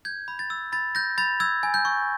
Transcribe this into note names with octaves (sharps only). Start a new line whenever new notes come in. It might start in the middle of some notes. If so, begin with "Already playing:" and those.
G6 G#6
B5
A6
E6
B5 A6
G6 A#6
B5 A6
E6 G#6
G#5
G6
C#6